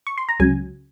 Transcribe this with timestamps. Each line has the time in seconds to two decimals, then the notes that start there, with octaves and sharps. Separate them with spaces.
0.07 C#6
0.18 C6
0.29 A#5
0.40 C#2 C#3 F#3 G#5